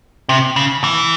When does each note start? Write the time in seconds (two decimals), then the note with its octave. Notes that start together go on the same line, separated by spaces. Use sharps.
0.29 C3
0.56 C#3
0.84 E3